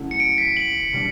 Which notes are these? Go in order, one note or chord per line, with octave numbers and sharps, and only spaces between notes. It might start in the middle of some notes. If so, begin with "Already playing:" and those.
Already playing: C#3 F#3 A3 E4
C#7
D7
B6
F#7
B2 G3 D4